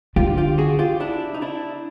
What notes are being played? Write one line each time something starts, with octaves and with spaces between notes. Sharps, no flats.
D3 F4 G4
F4 G4
F#4 G#4
F4 G4
D4 E4
D#4
D4 E4